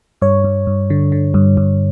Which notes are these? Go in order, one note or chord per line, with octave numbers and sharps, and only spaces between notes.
G2 C#5
G2
G2
D3
D3
G2
G2